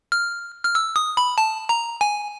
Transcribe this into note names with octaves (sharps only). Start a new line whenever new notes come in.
F6
F6
E6
D#6
B5
A5
A#5
G#5